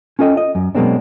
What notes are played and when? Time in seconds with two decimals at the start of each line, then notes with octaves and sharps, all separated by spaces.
0.19 C#4 F4 A4 D#5 G5
0.37 D#5
0.55 F#2
0.75 B2 F#3 G#3 A#3 C4 D4